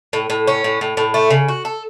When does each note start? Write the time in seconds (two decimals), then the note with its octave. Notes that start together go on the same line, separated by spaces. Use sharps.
0.13 A2
0.30 A2
0.47 C#4
0.64 A2
0.81 A2
0.97 A2
1.14 A3
1.30 C#3
1.48 F#4
1.65 A4